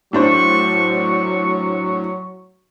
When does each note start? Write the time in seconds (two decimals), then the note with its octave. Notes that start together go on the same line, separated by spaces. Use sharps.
0.13 A2 F#3 D4 C5 C#6